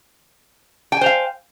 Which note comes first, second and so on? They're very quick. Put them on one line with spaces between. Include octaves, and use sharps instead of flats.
G5 G#5 C5 F5